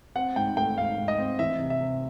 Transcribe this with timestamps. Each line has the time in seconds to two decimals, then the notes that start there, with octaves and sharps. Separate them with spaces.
0.16 C4 F#5
0.36 G#2 G5
0.57 A3 G5
0.78 G#2 F5
0.98 G#2
1.08 D#5
1.19 C4
1.39 E3 E5
1.60 C3
1.70 E5
1.80 C3